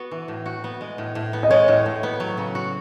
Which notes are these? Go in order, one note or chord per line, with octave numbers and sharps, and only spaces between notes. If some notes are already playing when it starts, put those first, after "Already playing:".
Already playing: B3 F#4
E3
A2
F#4
B3
G#3
A2
A2
B3
D#5
G#3 C#5
A2
A2
B3
F#3
C#3
F#4